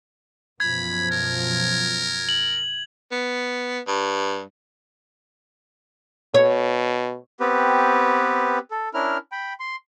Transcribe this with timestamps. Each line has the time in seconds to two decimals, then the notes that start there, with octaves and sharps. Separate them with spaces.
0.60 F#2 B2 F3 B5 G#6
1.11 A#4
2.29 F#7
3.11 B3
3.87 G2
6.34 B2 C#5
7.40 B3 C4 G4 B4
8.71 A4
8.94 C#4 D4 E4 A#4 F6
9.32 G5 B5
9.60 C6